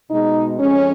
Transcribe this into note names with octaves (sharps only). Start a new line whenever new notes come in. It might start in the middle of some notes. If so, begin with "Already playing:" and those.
B2 G#3 D#4
F2 F3 G#3 C#4